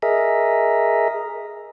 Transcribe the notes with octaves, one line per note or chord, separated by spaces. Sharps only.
G#4 A#4 D#5 E5